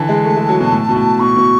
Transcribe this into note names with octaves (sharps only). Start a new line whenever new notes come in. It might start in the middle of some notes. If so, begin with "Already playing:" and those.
Already playing: D3 E3 A5
G#3
A3
G#3
F#3
B2
A2
B2
A2
B2 C#6
B2